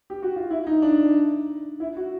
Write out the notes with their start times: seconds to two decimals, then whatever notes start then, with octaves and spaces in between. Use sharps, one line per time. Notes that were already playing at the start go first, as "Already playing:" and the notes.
0.10 G4
0.23 F#4
0.36 F4
0.50 E4
0.67 D#4
0.82 D4
1.80 E4
1.97 F#4